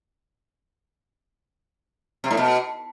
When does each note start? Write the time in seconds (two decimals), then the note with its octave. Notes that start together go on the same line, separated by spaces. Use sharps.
2.24 C3
2.31 A2
2.37 B2